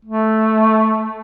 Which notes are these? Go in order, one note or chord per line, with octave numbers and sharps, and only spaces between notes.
A3